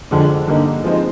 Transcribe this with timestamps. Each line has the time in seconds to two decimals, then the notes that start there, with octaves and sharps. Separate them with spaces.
0.11 F2 D3 G#3 D4
0.47 G2 D3 G3 A#3 D#4
0.83 F3 G#3 C4 D#4